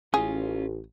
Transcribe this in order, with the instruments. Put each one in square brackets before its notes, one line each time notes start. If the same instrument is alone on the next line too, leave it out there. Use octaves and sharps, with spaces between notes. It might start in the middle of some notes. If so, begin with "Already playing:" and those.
[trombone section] A1 [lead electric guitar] C#4 F4 [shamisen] G#4